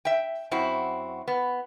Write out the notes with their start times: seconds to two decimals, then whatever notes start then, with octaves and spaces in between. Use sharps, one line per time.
0.05 E5 G5
0.51 F#2 C4 E4 F#4
1.28 B3